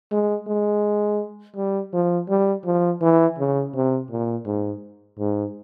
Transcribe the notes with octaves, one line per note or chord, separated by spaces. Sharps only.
G#3
G#3
G3
F3
G3
F3
E3
C#3
C3
A#2
G#2
G#2